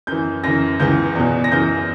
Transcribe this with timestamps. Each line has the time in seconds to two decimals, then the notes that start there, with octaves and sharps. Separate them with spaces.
0.07 F#2 E3 G6
0.44 F#2 C#3 E3 A#6
0.80 C#2 C#3 E3 G6
1.15 E2 B2
1.44 A#6
1.51 F#2 C#3 E3 G6